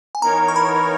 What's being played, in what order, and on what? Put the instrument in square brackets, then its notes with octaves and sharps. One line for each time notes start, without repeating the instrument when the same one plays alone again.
[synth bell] G#5
[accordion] E3 B3 D#4 A#4 C#5 [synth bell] A#5
[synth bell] C#6
B5